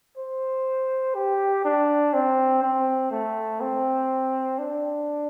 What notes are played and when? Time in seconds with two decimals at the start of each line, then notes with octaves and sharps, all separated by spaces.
0.17 C5
1.15 G4
1.65 D4
2.14 C4
2.63 C4
3.11 A3
3.61 C4
4.59 D4